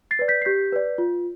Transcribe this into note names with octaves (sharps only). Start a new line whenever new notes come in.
A6 C7
B4 D5
G6 B6
C7
G4 G6 B6
B4 D5
F4